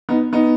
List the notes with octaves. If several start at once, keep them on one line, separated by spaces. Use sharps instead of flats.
B3 D#4
B3 D#4